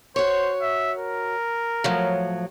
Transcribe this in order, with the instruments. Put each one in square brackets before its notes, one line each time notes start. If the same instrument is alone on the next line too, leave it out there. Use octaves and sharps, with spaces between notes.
[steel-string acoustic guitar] F#4 C#5 [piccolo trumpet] C5
[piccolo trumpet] E5
A#4
[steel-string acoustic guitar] A2 F3 F#3